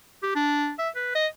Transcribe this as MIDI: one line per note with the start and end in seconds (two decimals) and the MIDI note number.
0.23 0.31 67
0.35 0.72 62
0.79 0.89 76
0.95 1.13 71
1.15 1.27 75